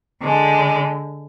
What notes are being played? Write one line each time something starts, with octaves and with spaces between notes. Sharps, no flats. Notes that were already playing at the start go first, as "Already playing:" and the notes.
D3 G#3